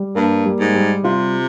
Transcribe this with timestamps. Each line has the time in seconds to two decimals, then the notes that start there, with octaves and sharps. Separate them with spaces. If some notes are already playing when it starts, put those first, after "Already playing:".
Already playing: G3
0.15 G2 A#3
0.45 G3
0.60 G#2
0.75 G3
1.04 C3 F4